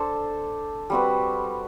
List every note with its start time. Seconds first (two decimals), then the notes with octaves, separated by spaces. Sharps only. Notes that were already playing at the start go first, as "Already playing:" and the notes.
Already playing: D4 A4 C5
0.90 G3 C4 F#4 B4